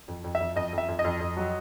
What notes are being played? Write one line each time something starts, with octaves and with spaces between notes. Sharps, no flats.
F2
F2
E5
F2
F2 D#5
F2
E5
F2
D#5
F2
F2
F#3